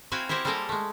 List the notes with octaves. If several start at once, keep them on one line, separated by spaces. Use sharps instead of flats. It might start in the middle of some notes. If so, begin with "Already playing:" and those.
C4 E4 F#4 F5 G5 G#5
E4 G4 A#4 C5 C#5
G3 G#3 A#3 A4 A#4 F5
G#3 A3